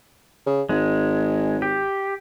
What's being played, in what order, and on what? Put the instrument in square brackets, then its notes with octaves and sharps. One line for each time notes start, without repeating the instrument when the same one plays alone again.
[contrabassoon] C#3
[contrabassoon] G#1 [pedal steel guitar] G#3
[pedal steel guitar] G4